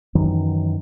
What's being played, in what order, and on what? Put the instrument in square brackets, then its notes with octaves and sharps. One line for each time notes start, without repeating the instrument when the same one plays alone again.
[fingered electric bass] F#2 D#3 E3 F#3